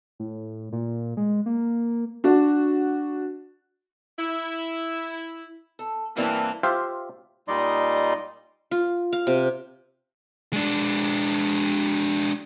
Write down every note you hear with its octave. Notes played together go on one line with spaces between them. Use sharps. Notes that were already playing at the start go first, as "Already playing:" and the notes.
A2
A#2
G#3
A#3
D4 F#4
E4
A4
G2 E3 A#3 C4 D4
F4 G4 C5 E5 F5
A#2 G3 D#4 D5 D#5 C6
F4
F5
C3
G#3 D4